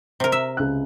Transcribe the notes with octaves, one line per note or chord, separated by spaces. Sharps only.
C3 A#4
E5
C#2 F#6